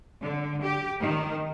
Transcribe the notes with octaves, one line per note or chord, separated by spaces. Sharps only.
D3
G4
D#3